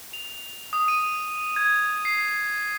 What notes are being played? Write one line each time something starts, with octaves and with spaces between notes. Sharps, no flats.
F7
D#6
D#7
G#6
C7